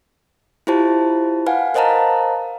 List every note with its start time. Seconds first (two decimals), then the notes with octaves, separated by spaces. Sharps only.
0.67 E4 F4 G4 C5 A5
1.46 B4 F5 F#5 G#5
1.74 A#4 C5 D#5 F5 A5 A#5